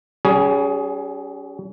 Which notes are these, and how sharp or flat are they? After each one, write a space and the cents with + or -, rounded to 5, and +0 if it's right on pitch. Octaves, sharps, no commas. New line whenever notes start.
G3 -30 C#4 +30 G#4 +10